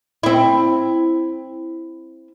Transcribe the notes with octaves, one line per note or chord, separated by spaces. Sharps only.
C4 E4